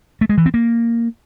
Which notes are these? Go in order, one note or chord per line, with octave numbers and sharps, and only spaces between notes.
A3
G#3
E3
C4
A#3